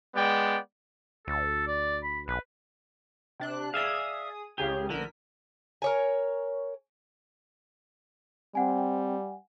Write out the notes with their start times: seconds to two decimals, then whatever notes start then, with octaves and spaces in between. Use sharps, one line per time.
0.15 G#3 B3 D5 G5
1.28 D2 A4
1.68 D5
2.03 B5
2.28 B1 B4
3.40 C3 D4 F#6
3.74 G#4 D5 E5 F5 D#6
4.58 C#2 C#3 G4 G#4
4.90 A#1 D3 A#4 B6
5.82 A#4 C#5 G#5
8.55 G3 C4 F#5 G#5